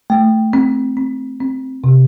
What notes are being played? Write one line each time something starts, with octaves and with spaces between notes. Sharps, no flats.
A3
C4
C4
C4
C3